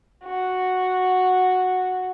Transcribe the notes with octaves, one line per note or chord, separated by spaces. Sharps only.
F#4